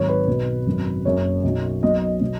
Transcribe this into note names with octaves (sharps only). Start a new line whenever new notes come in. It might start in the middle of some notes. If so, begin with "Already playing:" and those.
Already playing: G#1 G#2 D#3 F#3 C#5
B4
B1 B2 F#3
G#1 F#2 F#3
F#1 F#2 C#3 C#5
B1 B2 F#3
B1 B2 F#3 D#5
B2 F#3